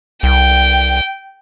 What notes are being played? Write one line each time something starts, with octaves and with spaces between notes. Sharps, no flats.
C2 G5